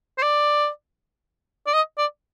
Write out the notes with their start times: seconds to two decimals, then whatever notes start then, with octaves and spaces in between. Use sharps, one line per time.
0.18 C5
0.23 D5
1.67 D5
1.73 D#5
1.98 D5